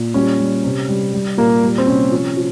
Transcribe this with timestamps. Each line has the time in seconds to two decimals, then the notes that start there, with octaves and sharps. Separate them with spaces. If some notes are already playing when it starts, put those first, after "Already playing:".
Already playing: A#2
0.14 G3 C#4
0.39 G3
0.64 C3
0.88 G3
1.13 G3
1.37 A#2 A#3
1.63 G3
1.78 C4
1.87 C3 C#4
2.12 F3
2.37 F3